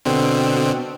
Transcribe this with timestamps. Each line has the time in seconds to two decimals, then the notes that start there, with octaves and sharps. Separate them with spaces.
0.05 B2 D3 C4